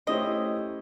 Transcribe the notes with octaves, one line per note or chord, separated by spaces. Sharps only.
A3 C#4 E4 G4 C5 D#5